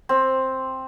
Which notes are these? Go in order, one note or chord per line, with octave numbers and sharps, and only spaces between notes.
C4